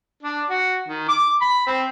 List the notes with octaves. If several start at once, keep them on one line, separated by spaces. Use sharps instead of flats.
D4
F#4
D#3
D6
B5
C4